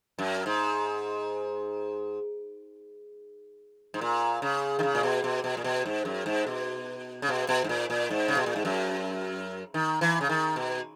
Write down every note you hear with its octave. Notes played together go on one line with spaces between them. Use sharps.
F#2
G#2
G#2
A#2
C#3
D#3
C#3
A#2
B2
B2
B2
A#2
B2
G#2
F#2
G#2
B2
C#3
B2
B2
G#2
A#2
A#2
G#2
C#3
B2
A#2
G#2
F#2
D#3
E3
C#3
D#3
B2